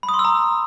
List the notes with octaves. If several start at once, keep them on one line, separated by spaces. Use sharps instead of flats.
B5
D#6
C6
E6
A#5